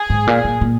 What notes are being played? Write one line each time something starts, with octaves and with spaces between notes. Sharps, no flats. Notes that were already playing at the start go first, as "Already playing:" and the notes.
Already playing: G#4
G#2
A#2
A#2
A#2